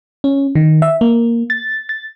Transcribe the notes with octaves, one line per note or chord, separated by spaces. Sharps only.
C#4
D#3
E5
A#3
A6
A6